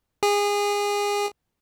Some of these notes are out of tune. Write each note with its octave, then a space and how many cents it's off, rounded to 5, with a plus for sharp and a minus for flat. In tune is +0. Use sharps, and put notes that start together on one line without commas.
G#4 -25